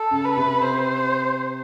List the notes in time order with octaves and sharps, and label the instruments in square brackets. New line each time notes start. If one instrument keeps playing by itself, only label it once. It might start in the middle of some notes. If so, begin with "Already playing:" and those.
Already playing: [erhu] A4
[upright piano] C#3
[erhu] B4
[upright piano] C3
[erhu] C5